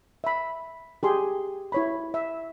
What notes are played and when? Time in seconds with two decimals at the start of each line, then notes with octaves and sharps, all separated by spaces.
0.24 E5 B5
1.03 G4 G#4 C6
1.72 E4 C#5 B5
2.14 E5